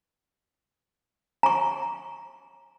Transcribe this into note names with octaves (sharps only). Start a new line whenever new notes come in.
A#5 C#6